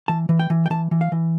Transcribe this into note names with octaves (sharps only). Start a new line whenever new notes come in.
E3 A5
E3
G5
E3
G5
E3 A5
E3
F5
E3